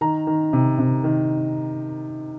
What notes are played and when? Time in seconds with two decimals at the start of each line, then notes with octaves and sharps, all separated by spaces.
0.01 D#3 A#5
0.27 D#3
0.53 C3
0.79 C3
1.04 D#3